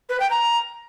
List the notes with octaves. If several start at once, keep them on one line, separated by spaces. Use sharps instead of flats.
B4
G5
A#5